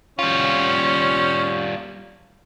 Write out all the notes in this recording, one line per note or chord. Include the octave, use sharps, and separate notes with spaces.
G3 C#4 F4